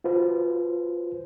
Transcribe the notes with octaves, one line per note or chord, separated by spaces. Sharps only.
F4 F#4 B4 C5